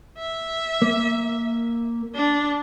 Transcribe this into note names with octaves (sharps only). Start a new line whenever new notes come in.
E5
A#3
D4